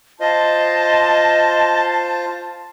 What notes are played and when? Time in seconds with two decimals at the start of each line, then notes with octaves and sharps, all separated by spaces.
0.20 F4 C5 D#5 A5